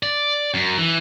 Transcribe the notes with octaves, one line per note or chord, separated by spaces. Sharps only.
D5
F#2
E3